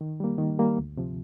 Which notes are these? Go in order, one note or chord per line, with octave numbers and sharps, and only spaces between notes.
D#3
G3 A#3
D#3
G3 A#3
D2
C3 F3